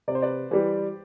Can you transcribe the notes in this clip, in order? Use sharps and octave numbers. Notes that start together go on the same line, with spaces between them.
C3 D5
C5
B4 D5
E3 G3 G4 B4